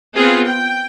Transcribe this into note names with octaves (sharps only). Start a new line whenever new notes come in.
B3 C4 F4 G#4
G5